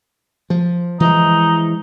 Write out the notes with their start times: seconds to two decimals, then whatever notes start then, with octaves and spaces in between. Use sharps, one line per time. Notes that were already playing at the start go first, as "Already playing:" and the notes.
0.50 F3
1.00 E3 F3 G#3 D#4